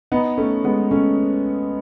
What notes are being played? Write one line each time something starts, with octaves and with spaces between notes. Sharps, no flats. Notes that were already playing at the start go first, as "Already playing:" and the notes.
B3 D#4
A3 C#4
G#3 B3
A3 C#4